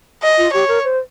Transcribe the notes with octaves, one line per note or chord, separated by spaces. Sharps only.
D#5
F4
G4 C#5
A#4
C5